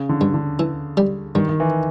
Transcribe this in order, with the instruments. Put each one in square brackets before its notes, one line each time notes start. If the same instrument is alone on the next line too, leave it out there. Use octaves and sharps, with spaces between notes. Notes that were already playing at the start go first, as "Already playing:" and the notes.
Already playing: [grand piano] C#3
D3
[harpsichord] G2
[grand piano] D3
[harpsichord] E3
G3
[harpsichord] G2 [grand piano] D#3
[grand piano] D#3
E3